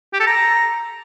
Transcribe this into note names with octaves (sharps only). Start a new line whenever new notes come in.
G4
A4
A#5